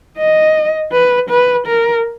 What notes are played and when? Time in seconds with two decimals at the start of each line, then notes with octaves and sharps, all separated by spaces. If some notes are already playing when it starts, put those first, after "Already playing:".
0.18 D#5
0.93 B4
1.30 B4
1.67 A#4